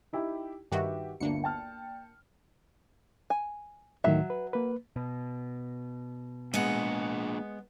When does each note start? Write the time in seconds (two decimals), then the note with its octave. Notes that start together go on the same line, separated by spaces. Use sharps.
0.13 D#4 E4 G4
0.72 G2 D#3 F#4 G4 B4 E5
1.20 G1 D2 A#3 D4 C#7
1.44 G5 A5 F6
3.30 G#5
4.04 D2 A2 D#3 F#3 E5
4.30 B4
4.53 A#3 B4
4.96 B2
6.54 G#3 A#3 B3 D4 G#4 F#5